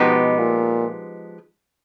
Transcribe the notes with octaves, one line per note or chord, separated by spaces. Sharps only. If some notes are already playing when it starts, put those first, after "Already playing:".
Already playing: B2 F3 G#3 B3 D#4 G4
A#2